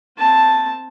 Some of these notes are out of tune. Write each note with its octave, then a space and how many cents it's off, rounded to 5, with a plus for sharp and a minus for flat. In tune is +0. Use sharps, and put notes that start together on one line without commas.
C4 +0 A5 +0